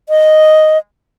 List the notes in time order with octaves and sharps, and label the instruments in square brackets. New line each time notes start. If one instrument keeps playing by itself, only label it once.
[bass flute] D#5